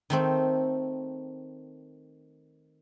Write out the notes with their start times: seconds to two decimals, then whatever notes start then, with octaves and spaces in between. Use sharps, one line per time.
0.10 D#3 A3 C4